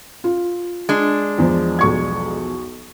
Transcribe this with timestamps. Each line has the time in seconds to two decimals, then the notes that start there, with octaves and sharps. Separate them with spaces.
0.24 F4
0.89 G#3 D4
1.38 E2 F3
1.79 B1 C#6 G#6